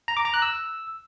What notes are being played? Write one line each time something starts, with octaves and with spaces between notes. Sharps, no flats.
A#5
D6
A#5
F#6
E6